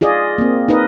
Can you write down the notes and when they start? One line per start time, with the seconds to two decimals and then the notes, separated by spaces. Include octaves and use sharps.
0.01 F4 G#4 D5 D#5
0.38 A#3 C4
0.68 D#4 A#4 B4 D#5